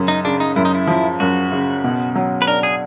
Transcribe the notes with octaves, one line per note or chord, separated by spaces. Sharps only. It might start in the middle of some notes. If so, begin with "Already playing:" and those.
Already playing: F#2 C#3
D#4
C#3 D4
D#4
F#2 E4
D#4
E4
F3
F#2 F#4
C#3
B2
F#3
B4
D4 A#4
G#4